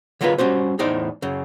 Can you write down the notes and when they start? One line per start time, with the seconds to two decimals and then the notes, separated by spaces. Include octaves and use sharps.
0.21 D3 F#3 G#3 A#3 F4 B4
0.38 G3 C#4 F#4 C5
0.79 E2 A2 D#4 C5 D5
1.22 F#2 C#3